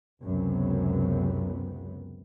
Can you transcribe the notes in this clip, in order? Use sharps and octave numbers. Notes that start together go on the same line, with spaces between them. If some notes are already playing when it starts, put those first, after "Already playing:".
C#2 F#2 C3 B3